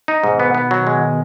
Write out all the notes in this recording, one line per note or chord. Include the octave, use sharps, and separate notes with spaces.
D#4
G#2 B2 D#3
B3
B3
F#3
G#3